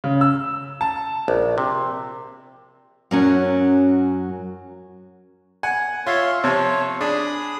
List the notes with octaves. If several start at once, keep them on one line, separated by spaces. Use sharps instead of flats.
C#3
E6
A5
A#1
C3
F#2 F#3 C#4
F#5 G#5
F4 C#5 E5 C6
C3 F3 C#5
D4 G#4 B5 D#6